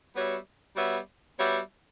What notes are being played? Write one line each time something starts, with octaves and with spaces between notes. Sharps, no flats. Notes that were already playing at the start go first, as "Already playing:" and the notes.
G3 B3 F#4 C#5 E5
G3 B3 F#4 C#5 E5
G3 B3 F#4 C#5 E5